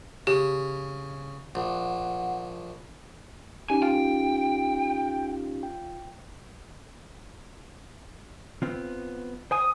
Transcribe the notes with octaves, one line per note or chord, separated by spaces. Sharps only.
C#3 G4
A#1 F#5
C#4 D#4 G4 G#5
F4 G5
G5
B3 C4 F4
C5 G5 G#5 D#6